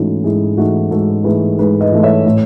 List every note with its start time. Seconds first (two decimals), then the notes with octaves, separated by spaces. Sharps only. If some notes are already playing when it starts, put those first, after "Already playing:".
Already playing: G#2 E3 A3 C#4 D#4 E4 F#4
0.24 G#2 E4 G#4
0.57 E3 A3 D#4 F#4
0.91 G#2 F#4 A4
1.24 E3 A3 G#4 B4
1.59 G#2 G#4 B4
1.80 B4 D#5
1.92 E3 A3
2.03 C#5 E5
2.26 A2